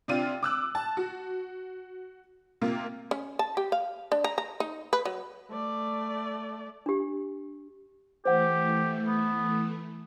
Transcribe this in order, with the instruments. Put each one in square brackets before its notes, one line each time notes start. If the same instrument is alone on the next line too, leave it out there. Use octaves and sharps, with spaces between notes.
[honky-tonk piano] C3 C4 D4 F4 D#7
D6 E6 F#6
A5
F#4
C3 A#3 F4
[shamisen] C#4
A5
G4
F5
D4
A#5
A#5
D#4
B4
F#3
[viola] A3 D5
[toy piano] D4 G4
[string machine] E3 A3 [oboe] G4 [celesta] C5 F#5
[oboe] B3